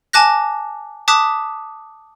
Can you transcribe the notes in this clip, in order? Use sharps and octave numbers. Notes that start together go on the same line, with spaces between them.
G#5 A5 D6 F#6 A#6
A5 D6 D#6 F#6 B6